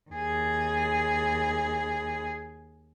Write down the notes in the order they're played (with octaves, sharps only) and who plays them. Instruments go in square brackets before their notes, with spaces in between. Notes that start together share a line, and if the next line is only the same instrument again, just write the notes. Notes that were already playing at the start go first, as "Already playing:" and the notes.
[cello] D#2 G#4